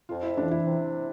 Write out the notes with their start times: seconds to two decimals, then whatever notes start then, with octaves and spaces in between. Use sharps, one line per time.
0.09 F2 F4
0.23 E4
0.37 E3 D4
0.51 E4
0.65 C3